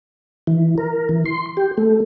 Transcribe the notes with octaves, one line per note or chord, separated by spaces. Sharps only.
E3
A#4
E3
C6
G4
A3